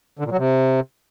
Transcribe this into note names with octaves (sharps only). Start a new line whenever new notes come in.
D3
A#2
F#3
C3